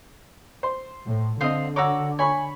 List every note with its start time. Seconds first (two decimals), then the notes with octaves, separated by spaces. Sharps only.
0.63 C5
1.06 A2
1.41 D3 C4 C5 D#5 F5 D#6
1.76 F#4 C#5 A#5 D6 E6
2.19 C#5 G#5 B5 C#6